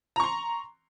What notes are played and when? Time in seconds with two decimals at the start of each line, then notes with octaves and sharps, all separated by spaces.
0.16 A#5
0.20 C#6
0.24 C6